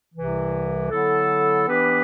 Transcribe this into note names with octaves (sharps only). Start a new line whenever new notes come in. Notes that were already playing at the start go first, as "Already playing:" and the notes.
C2 C3 E3
D3 F#3 B3 E4 A4
E3 B3 D4 G4 B4